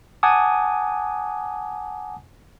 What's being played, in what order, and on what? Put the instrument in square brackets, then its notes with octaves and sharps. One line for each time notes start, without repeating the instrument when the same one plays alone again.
[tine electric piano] F#5 G#5 A5 D6 D#6